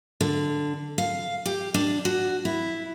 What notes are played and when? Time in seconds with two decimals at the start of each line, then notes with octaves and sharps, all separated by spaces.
0.21 D3
0.98 F5
1.46 G4
1.74 D4
2.05 F#4
2.45 E4